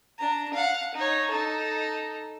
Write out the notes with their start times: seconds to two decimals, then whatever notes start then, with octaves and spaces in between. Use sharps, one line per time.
0.18 D4 A#5
0.54 F5 F#5
0.95 D#4 C#5
1.30 D#4 A4